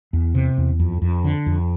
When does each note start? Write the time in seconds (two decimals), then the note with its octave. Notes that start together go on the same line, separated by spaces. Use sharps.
0.13 E2
0.35 C3
0.58 E2
0.80 F2
1.02 F2
1.24 D3
1.46 F2